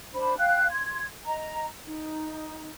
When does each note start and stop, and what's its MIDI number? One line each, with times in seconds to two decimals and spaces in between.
0.13 0.37 62
0.13 0.37 72
0.13 0.37 83
0.37 0.67 77
0.37 0.67 79
0.37 0.67 90
0.70 1.06 84
0.70 1.06 92
1.26 1.67 75
1.26 1.67 82
1.85 2.72 63